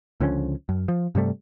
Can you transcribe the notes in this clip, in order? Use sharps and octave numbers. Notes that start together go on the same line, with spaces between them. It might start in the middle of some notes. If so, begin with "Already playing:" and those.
C#2 D3 F3 C#4
F#2
F3
G2 C3 G3 A3